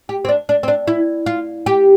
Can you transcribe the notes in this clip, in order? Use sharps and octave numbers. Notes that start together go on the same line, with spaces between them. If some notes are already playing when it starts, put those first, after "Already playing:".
G4
C4
D4
D4
C4
D4
E4
F4
G4